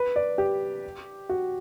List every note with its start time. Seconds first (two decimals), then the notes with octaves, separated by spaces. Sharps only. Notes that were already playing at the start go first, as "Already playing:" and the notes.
Already playing: B4
0.16 D5
0.38 G4
1.29 F#4